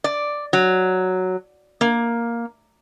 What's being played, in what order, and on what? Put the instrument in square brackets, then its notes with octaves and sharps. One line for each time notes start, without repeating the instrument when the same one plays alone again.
[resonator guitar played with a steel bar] D5
F#3
A#3